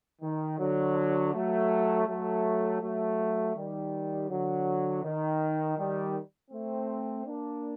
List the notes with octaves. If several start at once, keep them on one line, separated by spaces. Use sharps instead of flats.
D#3
D3 F#3
F#3 A3
F#3 A3
F#3 A3
D#3 G3
D3 F#3
D#3
D#3 G3
A3 C4
A#3 D4